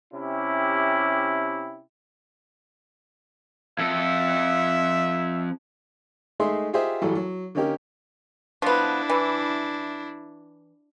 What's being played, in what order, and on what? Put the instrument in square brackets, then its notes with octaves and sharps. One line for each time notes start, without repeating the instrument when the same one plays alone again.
[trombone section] C3 C#4 E4 G4
[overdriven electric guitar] F2 A4 [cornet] E5
[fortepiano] G#3 A3 D#4 G#4 E5 C6
F4 G4 G#4 C5 D#5 E5
A1 E3 F#3 G3 A4
F#3
D3 A#3 C#4 D#4 G4 A#4
[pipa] F3 B3 [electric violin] D4 E4
[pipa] E3